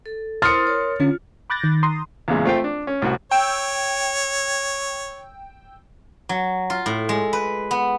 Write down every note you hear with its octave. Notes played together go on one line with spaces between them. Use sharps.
A4
E4 A#4 C5 C6 D#6 F6 A6 C#7
A#4 C#5
D3 C#4 F4
B5 D6 F#6 G6 A6 A#6
D#3
A#5 C6 D#6
E2 A#2 C#3 E3 G#3
A3 C4 F4 C5 F5 G5
D4
C#4
C2 A2 F#4
C#5 G5 E6
F#3
F4
A2
G#3
B4
B3